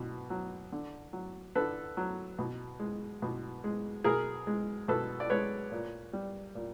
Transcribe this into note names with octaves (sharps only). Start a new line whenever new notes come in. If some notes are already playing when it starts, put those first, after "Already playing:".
Already playing: B2
F#3
D3
F#3
D3 A4 B4
F#3
B2
G#3
B2
G#3
B2 G#4 A#4
G#3
B2 A4 B4
D5
G#3 B4 C#5
A#2
G3
A#2